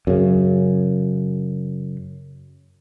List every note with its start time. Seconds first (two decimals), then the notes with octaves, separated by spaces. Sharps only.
0.07 F#2 C#3